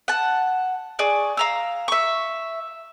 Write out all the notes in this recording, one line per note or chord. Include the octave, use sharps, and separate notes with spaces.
F#5 A5
G#4 D5 C#6
F5 A#5 E6
E5 C#6